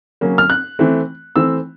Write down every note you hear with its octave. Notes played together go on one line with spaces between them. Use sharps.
C#3 F#3 A#3 C#4
F6
F#6
E3 A3 C4
E3 A3 C4 E6